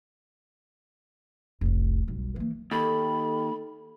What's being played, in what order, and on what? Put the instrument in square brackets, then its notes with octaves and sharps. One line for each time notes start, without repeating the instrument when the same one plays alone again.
[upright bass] F1 C2
B1 G3
E3 A#3
[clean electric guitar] D#2 [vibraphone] A4 [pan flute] B5